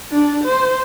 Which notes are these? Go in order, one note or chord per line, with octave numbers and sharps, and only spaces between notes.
D4
C5